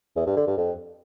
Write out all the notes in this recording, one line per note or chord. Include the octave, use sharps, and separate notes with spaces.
E2
G2
D3
G2
F2